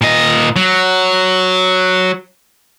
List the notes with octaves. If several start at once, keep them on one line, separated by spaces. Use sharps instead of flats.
A#2 D#5
F#3